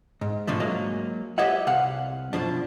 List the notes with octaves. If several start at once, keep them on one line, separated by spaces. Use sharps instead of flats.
G#2
B2 D3 F3 A3
F#3 G#3 A#3
G4 B4 C#5 D#5 E5 F#5
C2 F5 F#5
F#2 B2 F3 D4